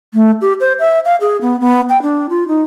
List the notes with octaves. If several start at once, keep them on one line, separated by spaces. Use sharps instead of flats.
A3
G4
C5
E5
F5
G#4
B3
B3
G5
D4
F4
D#4